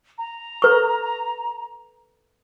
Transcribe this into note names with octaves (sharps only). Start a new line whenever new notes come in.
A#5
A4 B4 C#6